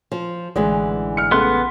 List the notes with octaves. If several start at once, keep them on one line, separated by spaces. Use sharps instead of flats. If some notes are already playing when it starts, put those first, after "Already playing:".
F3
A1 D3 E3 G#3
F6 C#7
C#2 A3 B3 C6 F#6